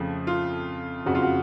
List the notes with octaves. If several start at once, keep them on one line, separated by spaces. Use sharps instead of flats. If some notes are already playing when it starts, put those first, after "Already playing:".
Already playing: F2 C#3 F3 A3
F4
F#1 F2 C#3 F#4
F4
F#4